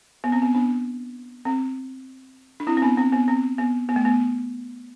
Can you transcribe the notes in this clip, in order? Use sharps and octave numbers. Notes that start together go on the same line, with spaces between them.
B3
C4
B3
B3 D4
C4
D4
C4 E4
C4
B3 D4
C4
B3
C4
B3
B3
A3
B3